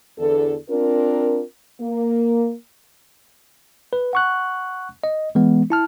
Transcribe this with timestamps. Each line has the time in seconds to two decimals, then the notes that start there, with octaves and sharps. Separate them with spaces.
0.18 E2 D3 A4
0.69 C4 D4 F4 A#4
1.81 A#3
3.93 B4
4.13 F#5 C#6 F#6
5.04 D#5
5.35 E3 G#3 B3
5.70 E4 A5 F6